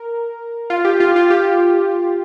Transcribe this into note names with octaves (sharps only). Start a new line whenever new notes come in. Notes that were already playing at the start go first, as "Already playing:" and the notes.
Already playing: A#4
F4
G4
F4
F4
G4